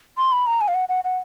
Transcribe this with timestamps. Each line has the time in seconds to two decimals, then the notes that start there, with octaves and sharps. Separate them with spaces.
0.17 C6
0.32 B5
0.47 A#5
0.61 G#5
0.68 F5
0.74 F#5
0.89 F#5
1.04 F#5